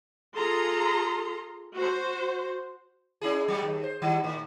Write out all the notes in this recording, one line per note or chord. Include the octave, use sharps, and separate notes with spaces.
F4 G#4 A4 A#5 C6
F#4 C5
C#4 E4 G#4
F#3 G#3 G4
D#2
C5
D#3 G3 E4
A2 D#3